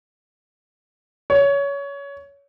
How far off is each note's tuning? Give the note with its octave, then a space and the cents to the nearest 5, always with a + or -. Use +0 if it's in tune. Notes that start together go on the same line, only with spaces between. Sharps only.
C#5 +20